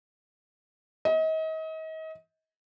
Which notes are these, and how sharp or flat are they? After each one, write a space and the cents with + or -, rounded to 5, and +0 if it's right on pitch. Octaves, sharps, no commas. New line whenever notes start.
D#5 +35